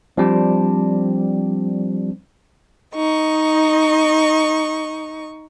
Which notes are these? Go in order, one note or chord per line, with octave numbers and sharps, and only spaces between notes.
F3 G3 C4 D4
D#4 D#5 C#6